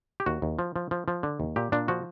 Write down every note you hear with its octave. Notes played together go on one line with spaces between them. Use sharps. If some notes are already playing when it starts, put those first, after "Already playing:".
G4
D#2 F#4
D#2
F3
F3
F3
F3
D3
D#2
A#2 G4
A#2 D4
F3 F#4